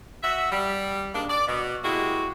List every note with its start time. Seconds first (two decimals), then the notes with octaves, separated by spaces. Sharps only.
0.23 F#4 E5
0.52 G3
1.15 G#2 A#3 D4
1.30 D5
1.48 B2
1.84 G#3 A#3 E4 F#4 G4